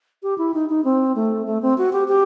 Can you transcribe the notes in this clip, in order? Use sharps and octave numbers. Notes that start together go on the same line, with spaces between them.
G4
E4
D#4
D#4
C4
A3
A3
C4
F#4
G4
G4